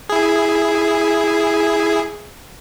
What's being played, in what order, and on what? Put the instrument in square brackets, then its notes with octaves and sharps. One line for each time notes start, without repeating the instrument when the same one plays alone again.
[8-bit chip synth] E4 G#4